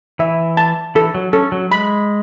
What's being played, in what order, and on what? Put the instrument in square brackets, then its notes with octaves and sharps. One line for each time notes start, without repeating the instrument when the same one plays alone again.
[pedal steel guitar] E3 [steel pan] E5
[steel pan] A5
[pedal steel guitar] E3 [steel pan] A4
[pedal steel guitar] F#3
[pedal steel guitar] C#4 [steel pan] A4
[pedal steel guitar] F#3
[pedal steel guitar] G#3 [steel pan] B5